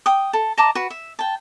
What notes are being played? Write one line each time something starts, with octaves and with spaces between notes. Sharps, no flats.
G5 D#6
A4
D#5 A5 A#5 D6
F#4 B4
E5
G5 A5